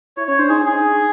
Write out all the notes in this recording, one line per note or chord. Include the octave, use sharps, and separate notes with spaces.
E4 C#5
C#4 C#5
D4 C5
D#4 G#4
D#4
G#4